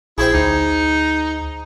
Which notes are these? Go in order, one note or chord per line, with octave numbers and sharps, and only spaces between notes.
A#1 E4 G#4 C5 G5
D2 D#4